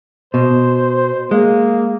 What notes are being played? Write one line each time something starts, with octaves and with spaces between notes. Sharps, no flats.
B2 C5
G#3 A#3